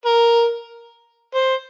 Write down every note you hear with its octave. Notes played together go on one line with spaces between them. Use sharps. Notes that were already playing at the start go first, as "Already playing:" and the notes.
A#4
C5